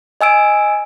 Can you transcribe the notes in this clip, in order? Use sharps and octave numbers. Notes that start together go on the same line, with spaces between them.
D#5 G#5 E6 D7